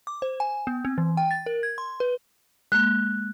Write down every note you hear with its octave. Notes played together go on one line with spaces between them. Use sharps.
D6
C5
G#5
B3
C4
E3
G5
A6
A#4
G#6
C6
B4
G#3 A#3 F#6